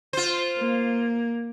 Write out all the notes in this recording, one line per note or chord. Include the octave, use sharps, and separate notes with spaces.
F4 C5
A#3